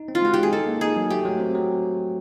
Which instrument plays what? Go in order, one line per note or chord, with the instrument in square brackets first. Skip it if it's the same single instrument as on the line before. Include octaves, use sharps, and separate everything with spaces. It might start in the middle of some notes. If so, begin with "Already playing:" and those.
Already playing: [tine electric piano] D#4
C4
[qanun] F4
[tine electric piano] G#3 [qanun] F#4
[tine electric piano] G#3 [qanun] G4
[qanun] G#4
[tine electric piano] D#4 [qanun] A4
[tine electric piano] A#3
[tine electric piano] D#4 [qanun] G#4
[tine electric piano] F#3
[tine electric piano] A3 [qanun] G4
[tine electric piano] F#3
C4
F#3